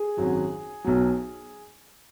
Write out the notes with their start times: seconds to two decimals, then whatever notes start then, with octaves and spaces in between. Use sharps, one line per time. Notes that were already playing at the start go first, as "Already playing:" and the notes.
Already playing: G#4
0.17 G#1 F#2 F#3
0.84 B1 B2 F#3